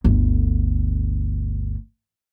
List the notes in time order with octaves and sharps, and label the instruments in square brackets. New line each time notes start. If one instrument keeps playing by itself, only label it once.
[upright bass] G1 D2